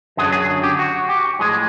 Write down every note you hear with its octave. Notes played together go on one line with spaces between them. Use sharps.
F#2 D3 F#3 G#4
G#4
G4
F#4
G4
A2 F3 G#3 G#4